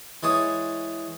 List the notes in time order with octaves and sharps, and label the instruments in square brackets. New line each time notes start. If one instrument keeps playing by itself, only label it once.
[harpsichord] E3 G#3 C#5 A5 D#6